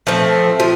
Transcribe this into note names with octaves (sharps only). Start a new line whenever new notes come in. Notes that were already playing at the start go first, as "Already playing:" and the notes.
F3 A3 C4
F3